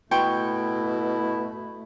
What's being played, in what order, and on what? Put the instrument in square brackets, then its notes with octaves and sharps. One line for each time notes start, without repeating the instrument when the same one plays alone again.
[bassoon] B2 [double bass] A3 [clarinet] E4 [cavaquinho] G5 C6 C#6